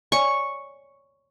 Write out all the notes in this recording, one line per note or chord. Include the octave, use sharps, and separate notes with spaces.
C#5 D5 G#5 C#6